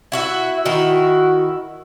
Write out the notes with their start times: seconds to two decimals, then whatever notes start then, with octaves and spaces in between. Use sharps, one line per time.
0.12 E4 F#4 E5
0.66 D#3 E4 F#4